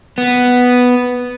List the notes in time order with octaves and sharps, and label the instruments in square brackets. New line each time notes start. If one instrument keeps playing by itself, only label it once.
[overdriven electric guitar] B3